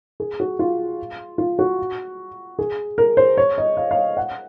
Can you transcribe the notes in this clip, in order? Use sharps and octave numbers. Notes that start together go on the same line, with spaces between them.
G#4
F#4
F4
F4
F#4
G#4
A#4
C5
C#5
D#5
F5
F5
F#5